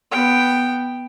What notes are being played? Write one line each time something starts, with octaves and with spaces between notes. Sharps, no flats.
B3 G5